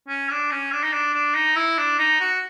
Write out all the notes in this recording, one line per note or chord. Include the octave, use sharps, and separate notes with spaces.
C#4
D4
C#4
D4
D#4
D4
D4
D#4
E4
D4
D#4
F#4